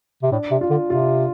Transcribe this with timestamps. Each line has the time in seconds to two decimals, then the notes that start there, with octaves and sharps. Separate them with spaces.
0.23 C3
0.32 A2 D4
0.51 C3
0.61 F4
0.70 D3
0.90 C3 F4